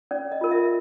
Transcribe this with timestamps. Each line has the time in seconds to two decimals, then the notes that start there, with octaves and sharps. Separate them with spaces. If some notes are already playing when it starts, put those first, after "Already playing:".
0.11 C#4 D5
0.32 D#5
0.41 F4 A#4
0.51 E5